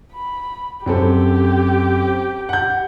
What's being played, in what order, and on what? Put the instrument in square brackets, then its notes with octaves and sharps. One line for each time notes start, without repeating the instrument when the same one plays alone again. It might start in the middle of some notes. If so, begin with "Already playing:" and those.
[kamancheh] B5
[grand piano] F#2 C4 A4 [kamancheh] G4
[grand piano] F#5 G6